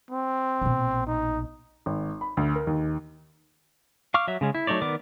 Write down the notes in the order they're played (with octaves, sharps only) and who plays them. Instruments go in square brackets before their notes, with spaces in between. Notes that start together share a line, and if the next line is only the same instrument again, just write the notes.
[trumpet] C4
[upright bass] A#1 B2
[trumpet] D#4
[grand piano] G#1
B5
D2
A#4
D#2
[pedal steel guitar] F5 C#6 D6 F6
F#3 E5
C#3 G#3 C#4
E4
F#3 A3 D#4 C#5 D5
D#3 B3 A#4 D5 D6